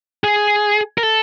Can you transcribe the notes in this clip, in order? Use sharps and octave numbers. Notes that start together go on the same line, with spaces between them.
G#4
A#4
A4